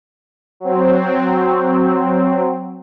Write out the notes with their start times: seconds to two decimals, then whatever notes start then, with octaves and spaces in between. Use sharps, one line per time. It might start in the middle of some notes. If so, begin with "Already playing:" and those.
0.60 F#3 C4